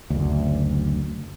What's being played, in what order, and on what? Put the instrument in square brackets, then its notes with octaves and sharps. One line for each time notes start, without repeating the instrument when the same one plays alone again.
[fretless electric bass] F#1 D2